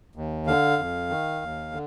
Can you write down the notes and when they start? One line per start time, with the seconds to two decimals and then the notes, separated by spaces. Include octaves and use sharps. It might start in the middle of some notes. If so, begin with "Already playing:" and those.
0.16 D#2
0.47 D3 F5
0.78 F2
1.10 D#3
1.42 D#2
1.72 D3